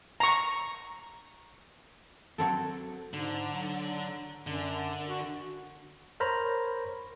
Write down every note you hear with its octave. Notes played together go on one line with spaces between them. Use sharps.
A#5 C#6
F#3 C4 A4
G#2 D3
F#3
F#2 D3
F#4
A#4 C5 C#5 A#5 B5